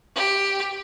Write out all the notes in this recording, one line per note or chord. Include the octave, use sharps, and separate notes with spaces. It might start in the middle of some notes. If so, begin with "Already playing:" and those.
G4